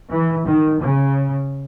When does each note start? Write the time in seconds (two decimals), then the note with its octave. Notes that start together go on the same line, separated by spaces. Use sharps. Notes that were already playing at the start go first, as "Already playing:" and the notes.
0.10 E3
0.45 D#3
0.81 C#3